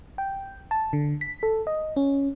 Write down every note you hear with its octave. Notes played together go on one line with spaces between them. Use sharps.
G5
A5
D3
B6
A4
D#5
C#4